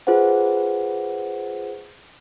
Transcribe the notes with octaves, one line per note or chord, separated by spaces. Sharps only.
F4 G#4 B4 C5 F#5